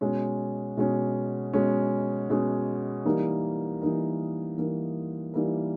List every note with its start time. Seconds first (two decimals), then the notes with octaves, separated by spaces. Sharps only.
0.01 B2 G#3 C#4
0.77 B2 G#3 C#4
1.53 B2 G#3 C#4
2.30 B2 G#3 C#4
3.05 E3 G3 A#3 D#4 A#4
3.82 E3 G3 A#3 D#4 A#4
4.57 E3 G3 A#3 D#4 A#4
5.34 E3 G3 A#3 D#4 A#4